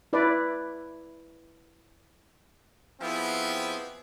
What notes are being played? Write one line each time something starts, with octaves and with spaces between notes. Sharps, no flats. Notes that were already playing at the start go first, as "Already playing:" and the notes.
E4 B4 D5
F3 B3 C4 E4 G4 G#4